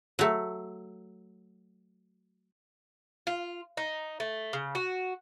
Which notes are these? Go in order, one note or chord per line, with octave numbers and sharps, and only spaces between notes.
F#3 A3
F4
D#4
A3
C#3
F#4